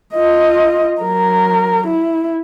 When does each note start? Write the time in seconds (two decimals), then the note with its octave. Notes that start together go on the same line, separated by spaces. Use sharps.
0.14 F4 D#5
1.01 F#3 A#4
1.87 E4